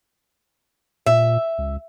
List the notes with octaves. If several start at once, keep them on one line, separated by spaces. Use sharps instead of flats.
A#2 E5
C#2